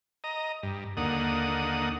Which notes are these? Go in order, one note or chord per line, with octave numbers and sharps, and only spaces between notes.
D#5 A#5
G2
D#2 D3 A#3 F#5 D#6